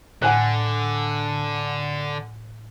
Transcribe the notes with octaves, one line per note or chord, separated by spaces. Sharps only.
A2 D3 F#5 G#5 F#6